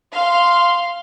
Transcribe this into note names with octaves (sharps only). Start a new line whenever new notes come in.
F5 C6